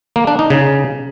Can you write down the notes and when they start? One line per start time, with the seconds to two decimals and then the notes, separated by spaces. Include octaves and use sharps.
0.16 A#3
0.27 D4
0.39 D#4
0.50 C#3